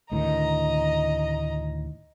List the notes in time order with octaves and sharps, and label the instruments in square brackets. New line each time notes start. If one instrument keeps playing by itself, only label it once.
[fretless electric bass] D2 A2 D#3 [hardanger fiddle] D#5 A#5